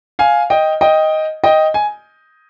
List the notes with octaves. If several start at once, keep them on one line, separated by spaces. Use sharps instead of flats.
F5 G#5
D#5 G5
D#5 G5
D#5 G5
G#5